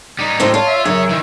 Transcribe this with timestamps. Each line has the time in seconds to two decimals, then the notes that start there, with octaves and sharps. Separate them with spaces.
0.19 G3 D#4
0.40 A2 C3 A4 C5
0.54 F4 C#5 A5
0.67 E5
0.86 F#2 G#4 C#5
1.09 D#3 E3 E5